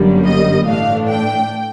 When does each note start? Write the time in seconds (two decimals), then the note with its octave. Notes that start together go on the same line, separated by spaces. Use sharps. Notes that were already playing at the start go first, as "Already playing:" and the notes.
Already playing: G1 F#2 D3 G3 A#3
0.25 D#5
0.66 A2 E3 A3 D4 F5
1.07 G5